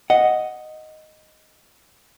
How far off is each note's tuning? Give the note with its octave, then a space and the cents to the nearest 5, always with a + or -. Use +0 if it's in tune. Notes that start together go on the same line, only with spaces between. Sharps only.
D#5 +0 F#5 +0